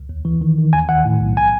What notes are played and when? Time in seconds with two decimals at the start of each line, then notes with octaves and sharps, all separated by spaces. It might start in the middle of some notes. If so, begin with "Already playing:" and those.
Already playing: C#2
0.09 D#2
0.25 E3
0.41 D#3
0.58 D#3
0.73 D#2 G#5
0.89 D#3 F#5
1.05 A2
1.21 B1
1.37 G#5